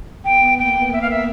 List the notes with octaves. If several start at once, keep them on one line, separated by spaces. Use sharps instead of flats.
B3 G5
A#3 G5
E5
F5
E5